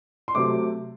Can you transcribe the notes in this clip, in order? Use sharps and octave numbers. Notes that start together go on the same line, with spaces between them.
C6
C3 F#3 A3 D6